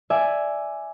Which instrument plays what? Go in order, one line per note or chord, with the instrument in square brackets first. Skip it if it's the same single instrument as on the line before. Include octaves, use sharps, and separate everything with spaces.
[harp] D5 E5 G#5